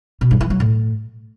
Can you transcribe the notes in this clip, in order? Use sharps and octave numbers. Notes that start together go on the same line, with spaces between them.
B2
G2
E3
F#3
A2